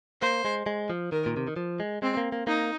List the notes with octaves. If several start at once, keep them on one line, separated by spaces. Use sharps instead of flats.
A#3 C5
G#3
G#3
F3
D#3 A#4
A#2
C3
D#3
F3
G#3
G#3 C4
A#3
A#3
A#3 D#4